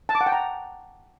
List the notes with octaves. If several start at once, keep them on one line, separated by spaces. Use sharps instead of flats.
A5
D6
F#5
G5
A#5